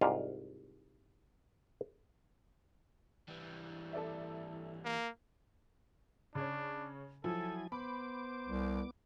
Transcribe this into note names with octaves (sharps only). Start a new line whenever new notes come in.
C2 G#2 F4 D5 F5
E3 G3
A4 D5 E5
A#3
C#3 D4 C#5
F3 F#3 E4 A4 G#5
B3 C5 B5 D6
C2